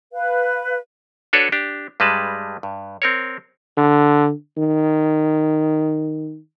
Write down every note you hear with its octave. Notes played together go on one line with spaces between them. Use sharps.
B4 F5
D4 F#4 A4 B4 C#5 D5
D4 G4
G2 G3 G#3 B4 A5
G2
C4 A#4 C#5
D3
D#3